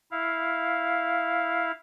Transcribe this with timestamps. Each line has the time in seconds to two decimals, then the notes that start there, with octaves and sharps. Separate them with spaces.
0.11 E4 F5